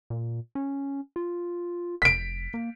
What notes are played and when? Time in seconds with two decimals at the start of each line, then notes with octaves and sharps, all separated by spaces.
0.10 A#2
0.55 C#4
1.16 F4
2.02 F1 B6 D7
2.54 A#3